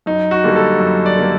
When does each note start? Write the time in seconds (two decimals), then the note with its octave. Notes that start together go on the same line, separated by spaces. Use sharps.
0.06 F#2 D#4
0.31 F#4
0.44 D3 G3 A#3
0.56 A4
0.80 F#2
1.06 D5
1.17 D3 G3 A#3